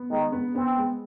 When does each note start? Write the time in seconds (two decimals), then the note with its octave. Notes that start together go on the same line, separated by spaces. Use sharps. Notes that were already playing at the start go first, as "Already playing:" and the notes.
Already playing: B3
0.10 D#3 G#3
0.32 B3
0.55 B3 C4
0.77 G#3